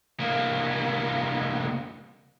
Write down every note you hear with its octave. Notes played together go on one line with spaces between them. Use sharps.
C2 A#3